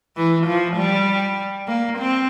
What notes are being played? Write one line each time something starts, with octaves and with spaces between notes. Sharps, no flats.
E3
F3
G3
A#3
C4